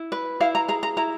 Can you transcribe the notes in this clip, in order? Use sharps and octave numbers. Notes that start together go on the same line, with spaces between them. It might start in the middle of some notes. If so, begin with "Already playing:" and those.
Already playing: E4
B4
E4 F5
A#5
G#4 A#5
A#5
E4 A#5